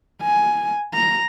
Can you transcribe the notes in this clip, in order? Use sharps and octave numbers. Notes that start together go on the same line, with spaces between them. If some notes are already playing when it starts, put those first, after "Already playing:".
G#5
A#5